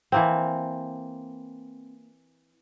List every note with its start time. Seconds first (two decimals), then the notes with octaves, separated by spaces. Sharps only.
0.12 E3 A#3 C4